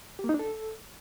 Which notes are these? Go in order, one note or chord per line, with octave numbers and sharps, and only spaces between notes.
G4
A#3
D#4
D4
A4